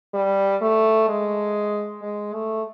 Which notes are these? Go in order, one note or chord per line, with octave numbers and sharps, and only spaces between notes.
G3
A3
G#3
G#3
A3